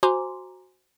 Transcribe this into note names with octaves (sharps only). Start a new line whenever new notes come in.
F#4 C5 G#5 A#5 C6 D6